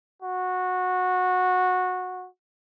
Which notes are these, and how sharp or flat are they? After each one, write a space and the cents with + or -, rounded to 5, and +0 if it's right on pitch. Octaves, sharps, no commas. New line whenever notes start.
F#4 -15